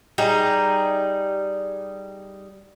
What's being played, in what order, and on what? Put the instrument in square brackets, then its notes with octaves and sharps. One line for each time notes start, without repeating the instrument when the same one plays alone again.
[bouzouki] G3 D#4 G#4